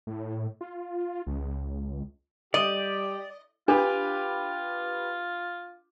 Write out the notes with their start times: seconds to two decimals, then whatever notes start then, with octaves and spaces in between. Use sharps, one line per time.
0.07 A2
0.61 F4
1.27 C#2
2.54 G3 G4 D5 D#5
3.68 D4 F4 G4 B4